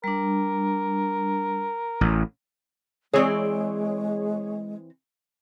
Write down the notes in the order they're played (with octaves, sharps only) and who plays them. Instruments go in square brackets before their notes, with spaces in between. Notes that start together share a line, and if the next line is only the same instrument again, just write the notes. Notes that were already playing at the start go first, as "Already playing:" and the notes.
[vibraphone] G3 D4 [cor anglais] A#4
[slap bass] A1
[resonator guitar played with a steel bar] E3 C4 D5 [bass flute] G#3 [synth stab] G#4 C#5